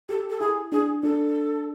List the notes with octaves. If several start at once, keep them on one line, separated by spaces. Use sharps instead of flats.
G4 A4
A4
E4 G#4
D4 G#4
D4 A4